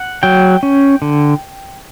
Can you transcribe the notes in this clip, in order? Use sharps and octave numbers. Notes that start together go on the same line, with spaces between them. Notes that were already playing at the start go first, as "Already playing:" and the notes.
Already playing: F#5
F#3 G5
C#4
D3